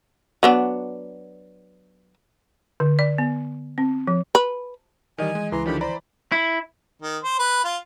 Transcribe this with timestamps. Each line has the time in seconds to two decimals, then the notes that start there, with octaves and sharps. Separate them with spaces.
0.43 F#3 B3 D4
2.80 D3
2.99 D5
3.18 B3
3.78 C4
4.07 F3
4.35 B4
5.18 D#3 E3 G3 D#5 G#5
5.35 G#3
5.52 C#2 E3 A#5 C6
5.66 D3 D#3 F3 D4 G4 B5
5.81 C5 D5 A#5 B5
6.32 E4
7.02 D#3
7.23 C5
7.39 B4
7.65 F4